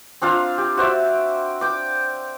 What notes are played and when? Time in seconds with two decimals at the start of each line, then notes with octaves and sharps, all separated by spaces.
0.22 C4 D4 F4 A#5
0.58 G4
0.77 F#4 C5 D5 E5
1.61 G5 D6